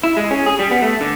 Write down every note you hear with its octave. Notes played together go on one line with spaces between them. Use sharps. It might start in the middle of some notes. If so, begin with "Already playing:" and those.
E4
G#3
C#4
G#4
G3
B3
A3
D3